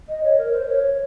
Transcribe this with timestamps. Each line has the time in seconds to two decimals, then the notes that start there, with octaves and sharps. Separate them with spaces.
0.09 D#5
0.23 C#5
0.38 A#4
0.52 C5
0.67 C#5